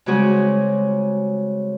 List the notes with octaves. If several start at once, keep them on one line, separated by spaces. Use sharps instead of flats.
C#3 G3 G#3 C4 F#4 G#4